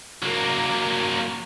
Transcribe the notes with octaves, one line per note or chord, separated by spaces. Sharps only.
F#3 A#3